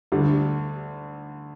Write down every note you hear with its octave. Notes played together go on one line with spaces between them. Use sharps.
D2 D3 G3